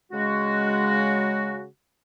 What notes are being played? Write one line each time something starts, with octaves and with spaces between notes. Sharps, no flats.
C#3 G#3 F#4